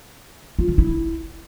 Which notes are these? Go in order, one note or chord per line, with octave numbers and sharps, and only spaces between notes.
F4
D3
E4